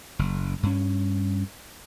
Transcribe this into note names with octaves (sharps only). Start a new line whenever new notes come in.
F#1
G2 C#4